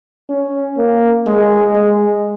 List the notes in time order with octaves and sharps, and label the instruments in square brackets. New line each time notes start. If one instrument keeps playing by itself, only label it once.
[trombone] C#4
A#3
G#3
G#3